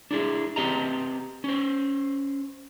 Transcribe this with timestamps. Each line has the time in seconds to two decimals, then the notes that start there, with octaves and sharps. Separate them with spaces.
0.11 D4 E4 G#4
0.56 C4 G4 D#5 A5 A#5
1.44 C#4 C5